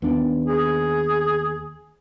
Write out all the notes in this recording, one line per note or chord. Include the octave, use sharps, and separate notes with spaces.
D#2 B3 D4
G#4